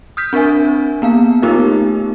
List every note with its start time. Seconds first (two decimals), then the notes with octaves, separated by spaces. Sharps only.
0.17 D#6 F6 G6 B6
0.33 C4 D4 A#4 E5 G#5
1.02 A#3 B3 F5
1.42 A3 B3 D#4 F4 G4 A#4